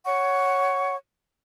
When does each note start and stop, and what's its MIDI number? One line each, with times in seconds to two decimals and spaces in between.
0.04 0.95 73
0.04 0.95 78
0.04 0.95 85